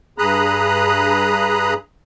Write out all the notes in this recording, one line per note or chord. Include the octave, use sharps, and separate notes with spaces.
G2 G#4 A#5 B5 D#6 F#6